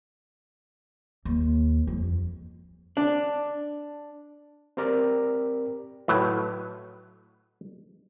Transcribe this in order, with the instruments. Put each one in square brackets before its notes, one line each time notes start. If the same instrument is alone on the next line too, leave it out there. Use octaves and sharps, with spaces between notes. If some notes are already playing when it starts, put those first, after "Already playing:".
[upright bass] D#2
F2
[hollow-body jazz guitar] D4
[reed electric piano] C4 G4 A#4 D5
[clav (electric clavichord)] A2 F#3 B4